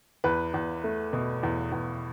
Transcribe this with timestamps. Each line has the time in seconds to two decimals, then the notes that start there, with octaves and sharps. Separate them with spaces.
0.24 E2 B4
0.54 E2
0.84 A3
1.13 B2
1.43 E2
1.72 E2